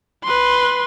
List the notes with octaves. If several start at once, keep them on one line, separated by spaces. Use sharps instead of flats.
B4 C6